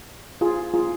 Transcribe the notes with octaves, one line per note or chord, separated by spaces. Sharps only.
F4 G#4
F4 G#4